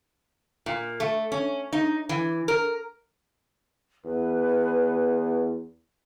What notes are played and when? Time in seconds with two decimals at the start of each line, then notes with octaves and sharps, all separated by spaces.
0.66 A#2
1.00 A3
1.32 C#4
1.73 D#4
2.09 E3
2.48 A#4
4.05 E2 B4